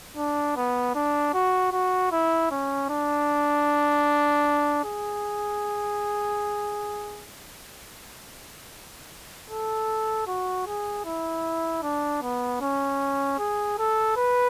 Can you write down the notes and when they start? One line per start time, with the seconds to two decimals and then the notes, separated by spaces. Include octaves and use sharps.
0.17 D4
0.57 B3
0.95 D4
1.34 F#4
1.72 F#4
2.12 E4
2.51 C#4
2.90 D4
4.84 G#4
9.50 A4
10.27 F#4
10.67 G#4
11.05 E4
11.83 D4
12.22 B3
12.61 C#4
13.39 G#4
13.78 A4
14.17 B4